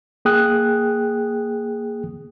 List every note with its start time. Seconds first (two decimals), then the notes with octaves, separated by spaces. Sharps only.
0.25 A#3 G#4 G5 D#6 F#6